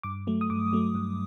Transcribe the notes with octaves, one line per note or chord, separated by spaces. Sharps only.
G2 D6
F#3 A3
D#6
G2 D6
F#3 A3
G2